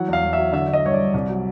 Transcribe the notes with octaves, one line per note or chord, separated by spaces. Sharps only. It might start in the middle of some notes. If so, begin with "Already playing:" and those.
Already playing: E3 F#3 F#5
E2 F5
E2
F#3 E5
D3 E5
D3
D#5
G2 C#5
D5
G2
C2
F#3